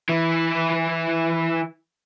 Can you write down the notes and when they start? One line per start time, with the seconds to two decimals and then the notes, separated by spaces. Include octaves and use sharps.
0.09 E3 E4